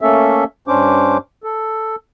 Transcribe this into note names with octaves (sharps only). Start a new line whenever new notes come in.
A3 A#3 C#4 A4 E5
G2 C#4 D4 C5 D6
A4